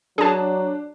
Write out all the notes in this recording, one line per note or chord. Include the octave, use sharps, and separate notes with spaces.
F#3 D4 G#4 A5